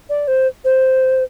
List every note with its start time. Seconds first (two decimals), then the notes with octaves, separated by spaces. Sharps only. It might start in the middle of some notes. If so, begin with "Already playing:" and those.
0.09 D5
0.28 C5
0.64 C5